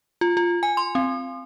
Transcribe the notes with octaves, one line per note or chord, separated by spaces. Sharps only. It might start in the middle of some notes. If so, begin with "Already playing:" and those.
F4
F4
G#5
C6
C4